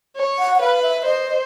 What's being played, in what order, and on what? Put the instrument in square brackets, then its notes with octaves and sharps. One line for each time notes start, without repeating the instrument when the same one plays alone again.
[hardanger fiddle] C#5
[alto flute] F#5
F#5
[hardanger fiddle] B4 [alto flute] F5
[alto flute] E5
E5
[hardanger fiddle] C5 [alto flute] D#5